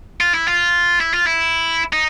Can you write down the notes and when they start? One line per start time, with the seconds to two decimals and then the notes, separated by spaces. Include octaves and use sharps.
0.21 F4
0.34 E4
0.48 F4
1.00 E4
1.14 F4
1.27 E4
1.93 D#4